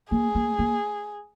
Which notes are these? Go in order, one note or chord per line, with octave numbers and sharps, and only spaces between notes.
A#3 G#4
A#3
A#3